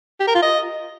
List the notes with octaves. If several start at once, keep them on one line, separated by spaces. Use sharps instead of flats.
G4
A#4
F4
D#5